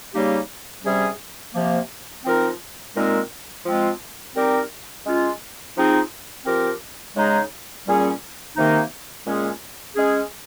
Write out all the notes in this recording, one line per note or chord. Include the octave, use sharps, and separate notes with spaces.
C#3 G3 A#3 D#4 G4
C3 G3 C#4 G#4
C3 F3 A#3
F3 C4 D#4 A#4
A#2 G#3 C4 D#4 A#4
F3 G#3 C4 F4
G3 C4 D#4 G4 A#4
G#3 C#4 F4
F3 C4 D#4 G#4
F3 C4 G4 A#4
C#3 G#3 D#4 G#4
A#2 G3 C#4 G#4
C3 D#3 A#3 D#4
A#2 G#3 C#4 G#4
G#3 C#4 G#4